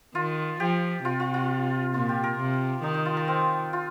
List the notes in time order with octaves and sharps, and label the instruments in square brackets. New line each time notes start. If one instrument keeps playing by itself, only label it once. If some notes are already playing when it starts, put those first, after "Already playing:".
[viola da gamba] D#3 [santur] F4
[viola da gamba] F3 [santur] G4
[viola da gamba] C3 [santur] F4
[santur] F4
F4
[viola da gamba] A#2 [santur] F4
[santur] G4
A#4
[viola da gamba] C3
[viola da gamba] D#3 [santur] D#4
[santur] D#4
F4
A#4
C4
F4